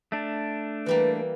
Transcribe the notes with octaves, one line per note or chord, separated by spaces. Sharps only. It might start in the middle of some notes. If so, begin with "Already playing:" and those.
A3 D4
E3 G3 A#3 B4